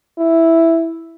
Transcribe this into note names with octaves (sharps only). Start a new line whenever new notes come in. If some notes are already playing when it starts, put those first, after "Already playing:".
E4